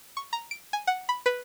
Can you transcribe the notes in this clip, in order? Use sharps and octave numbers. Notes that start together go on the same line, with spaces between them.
C#6
A#5
D7
G#5
F#5
B5
B4